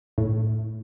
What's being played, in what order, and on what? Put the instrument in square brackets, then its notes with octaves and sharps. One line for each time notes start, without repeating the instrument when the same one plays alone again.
[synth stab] A2